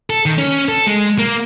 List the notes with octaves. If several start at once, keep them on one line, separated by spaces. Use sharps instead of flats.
A4
D#3
C#4
A4
G#3
A#3